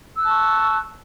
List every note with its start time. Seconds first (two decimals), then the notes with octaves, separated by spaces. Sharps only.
0.17 E6
0.21 F#6
0.25 A5
0.30 C#6